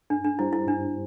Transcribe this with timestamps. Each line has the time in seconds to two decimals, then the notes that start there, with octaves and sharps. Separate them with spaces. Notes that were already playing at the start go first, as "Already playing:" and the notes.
0.10 G2 D4
0.24 D4
0.39 G3 D4 E4 G4 C5
0.53 E4
0.67 G2 D4